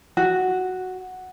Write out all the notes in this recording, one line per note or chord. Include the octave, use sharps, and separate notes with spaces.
F#4